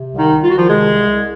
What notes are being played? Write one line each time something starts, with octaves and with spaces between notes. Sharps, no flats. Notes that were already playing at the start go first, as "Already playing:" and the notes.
Already playing: C3
C2
D#3 D#4
C2
F4
D#3 F#4
F3 F4
C3 G#3 G#4
C2
C2